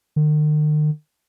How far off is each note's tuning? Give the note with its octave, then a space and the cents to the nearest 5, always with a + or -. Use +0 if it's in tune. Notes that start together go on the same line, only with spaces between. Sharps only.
D#3 -45